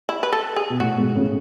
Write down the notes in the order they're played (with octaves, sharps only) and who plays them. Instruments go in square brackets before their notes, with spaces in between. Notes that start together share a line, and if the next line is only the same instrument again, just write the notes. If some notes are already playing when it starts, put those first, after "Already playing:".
[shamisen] E4
B4
A4
G#4
[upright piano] B2
[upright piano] A2 [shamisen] F#4
[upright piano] G#2 B2
A2 C#3